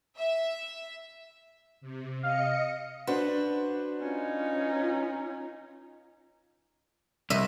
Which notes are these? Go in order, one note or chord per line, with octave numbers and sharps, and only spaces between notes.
E5
C3
D#5 F5 C#7
D4 F#4 B4 C5
C#4 D#4 F4
C2 D#5 E5